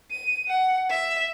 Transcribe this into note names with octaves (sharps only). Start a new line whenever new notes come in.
D#7
F#5
E5